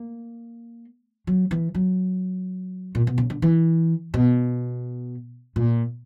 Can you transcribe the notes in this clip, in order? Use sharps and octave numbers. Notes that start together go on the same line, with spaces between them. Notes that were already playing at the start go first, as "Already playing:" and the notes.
Already playing: A#3
F#3
E3
F#3
A#2
B2
C#3
D3
E3
B2
A#2